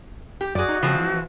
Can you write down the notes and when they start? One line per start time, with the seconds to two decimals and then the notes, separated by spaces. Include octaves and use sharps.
0.41 G4
0.55 F#2 F#4 G#4 D5
0.68 D#4
0.83 C#3 F3 G#3 C4
0.96 E3